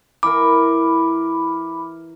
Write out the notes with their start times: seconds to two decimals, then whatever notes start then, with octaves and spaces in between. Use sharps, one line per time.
0.23 E3 A#4 B5 D6